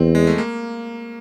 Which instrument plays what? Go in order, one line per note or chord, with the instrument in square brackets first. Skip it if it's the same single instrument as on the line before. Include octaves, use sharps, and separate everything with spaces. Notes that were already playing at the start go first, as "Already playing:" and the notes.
Already playing: [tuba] E2 [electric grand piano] C4
[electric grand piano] G#3
A3
A#3